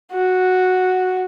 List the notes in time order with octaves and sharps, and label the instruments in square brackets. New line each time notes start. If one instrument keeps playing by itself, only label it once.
[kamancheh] F#4